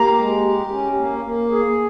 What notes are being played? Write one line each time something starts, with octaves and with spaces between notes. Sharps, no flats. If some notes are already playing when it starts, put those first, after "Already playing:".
Already playing: A#3 G4 A#5
G#3
G4
C#4
A#3
A#3
G#4